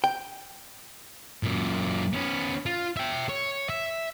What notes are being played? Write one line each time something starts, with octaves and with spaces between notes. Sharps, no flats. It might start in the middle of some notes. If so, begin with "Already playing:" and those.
G5
F#2 A#2
B3 C#4
F4
E5 G5
C#5
E5